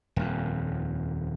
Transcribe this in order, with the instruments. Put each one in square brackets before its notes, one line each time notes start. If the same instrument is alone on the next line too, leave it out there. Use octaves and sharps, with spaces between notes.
[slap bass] D#1 F2